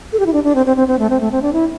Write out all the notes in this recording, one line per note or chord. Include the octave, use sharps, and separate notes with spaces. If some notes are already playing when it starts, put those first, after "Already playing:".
A4
G4
E4
D4
D4
C4
C4
C4
C4
A3
C4
A3
C4
D4
E4